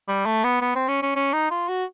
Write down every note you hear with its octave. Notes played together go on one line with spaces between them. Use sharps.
G3
A3
B3
B3
C4
C#4
C#4
C#4
D#4
F4
F#4